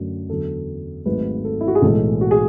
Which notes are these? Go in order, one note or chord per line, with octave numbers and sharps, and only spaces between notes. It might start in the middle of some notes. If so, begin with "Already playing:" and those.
Already playing: F#2 D3 F#3 A3
E2 D3 F#3 A4
G#1 G#2 F#3 A3 B4
A4
E4
F#4
G#4
B1 A2 E3 G#3 A4
F#4
G#4